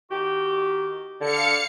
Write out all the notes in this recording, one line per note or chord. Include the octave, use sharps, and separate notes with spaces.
D#3 F#4 G4
D3 F5 C#7